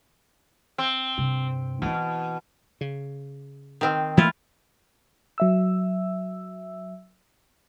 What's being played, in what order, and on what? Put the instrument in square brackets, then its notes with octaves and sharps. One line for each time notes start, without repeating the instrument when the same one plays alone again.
[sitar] C4
[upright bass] G2 C3
[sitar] B2 [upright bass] E3 E4
[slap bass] C#3
[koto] D#3 C4
[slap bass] E3 A3 A#3 [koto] E4 F4
[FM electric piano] F#3 E5 E6